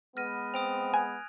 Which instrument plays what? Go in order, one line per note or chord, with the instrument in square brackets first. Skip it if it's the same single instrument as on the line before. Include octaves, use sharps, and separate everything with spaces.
[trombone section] G#3 B3 [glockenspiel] F6 A#6 D#7
[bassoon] C4 [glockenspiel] D#6 D7 F7
[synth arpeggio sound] G#5 [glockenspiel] F#6 G#6